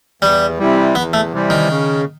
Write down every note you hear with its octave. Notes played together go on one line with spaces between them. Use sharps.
E2 G3
C3 E3 G3
E2 B3
A3
C3 E3 G3
D#3
C#3